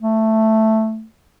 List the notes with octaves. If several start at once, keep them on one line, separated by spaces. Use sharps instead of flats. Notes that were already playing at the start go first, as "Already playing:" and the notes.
A3